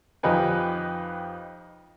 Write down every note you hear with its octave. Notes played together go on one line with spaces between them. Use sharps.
F2 D#4 G4 B4 G#5